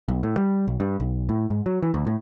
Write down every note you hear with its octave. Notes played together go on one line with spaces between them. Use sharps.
B1
A2
G3
B1
G2
B1
A2
G#2
F#3
E3
D2
A2